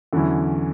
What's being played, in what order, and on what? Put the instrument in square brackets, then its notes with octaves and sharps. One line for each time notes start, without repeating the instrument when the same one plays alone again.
[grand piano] E2 D3 F#3 C#4 E4